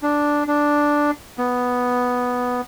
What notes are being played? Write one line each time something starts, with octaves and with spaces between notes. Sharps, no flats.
D4
D4
B3